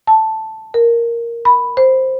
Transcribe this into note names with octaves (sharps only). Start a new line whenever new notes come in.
A5
A#4
B5
C5